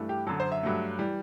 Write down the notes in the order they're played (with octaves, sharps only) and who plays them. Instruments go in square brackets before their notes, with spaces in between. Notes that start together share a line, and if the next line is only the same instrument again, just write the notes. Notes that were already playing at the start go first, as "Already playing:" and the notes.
Already playing: [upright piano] G2 E3 A3
G4
F#2 D3 F#3 A4
C5
E5
G2 F#3 A3
E3 G3